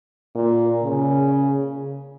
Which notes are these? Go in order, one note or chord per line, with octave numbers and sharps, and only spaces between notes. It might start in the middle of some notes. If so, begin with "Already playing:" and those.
A#2
C#3